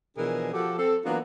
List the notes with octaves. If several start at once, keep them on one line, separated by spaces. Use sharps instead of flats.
B2 E3 F3 D4 G#4 A#4
F3 F#4 G4 A4
C4 A4
E3 F#3 A#3 B3 D4 F4